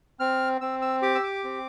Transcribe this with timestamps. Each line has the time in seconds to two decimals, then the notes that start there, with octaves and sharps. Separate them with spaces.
0.20 C4 F6
0.61 C4 E6
0.82 E6
1.02 G4 D6
1.15 E6
1.23 D6
1.44 C4